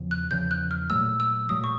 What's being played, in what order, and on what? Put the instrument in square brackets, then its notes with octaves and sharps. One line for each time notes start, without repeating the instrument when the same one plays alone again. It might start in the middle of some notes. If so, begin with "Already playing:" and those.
Already playing: [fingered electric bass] E2 C#3 F3
[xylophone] F#6
[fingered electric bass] E2 C#3 F3 [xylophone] G6
[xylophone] F#6
F6
[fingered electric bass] A#2 F#3 A3 [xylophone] E6
[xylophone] E6
[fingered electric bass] A#2 F#3 A3 [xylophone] D#6
[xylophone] C#6